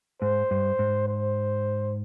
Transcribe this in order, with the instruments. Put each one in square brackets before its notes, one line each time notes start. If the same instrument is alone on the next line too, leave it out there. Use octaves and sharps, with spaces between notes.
[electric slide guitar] G#2 [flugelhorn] C5
[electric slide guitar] G2
G#2
[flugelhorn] C5